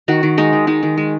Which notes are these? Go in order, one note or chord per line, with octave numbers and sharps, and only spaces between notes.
D#3 F#4
D#3
G#3 D#4
D#3
G#3 D#4
D#3
G#3